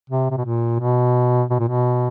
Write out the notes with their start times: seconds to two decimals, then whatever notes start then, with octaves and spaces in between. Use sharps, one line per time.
0.10 C3
0.31 C3
0.38 B2
0.45 A#2
0.80 B2
1.50 B2
1.60 A#2
1.69 B2